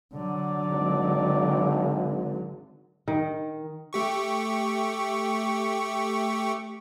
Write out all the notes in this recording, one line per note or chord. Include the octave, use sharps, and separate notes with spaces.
D3 F#3 D5
G#1
D#3
A3 G4 C#6